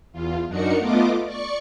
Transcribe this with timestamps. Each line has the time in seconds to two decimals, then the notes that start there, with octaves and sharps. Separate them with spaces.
0.13 E2 F4
0.47 F#2 D4 D#4 F#4 A#4 C#7
0.78 A3 B3 F4 D#5 D6
1.25 D5 C#6 C#7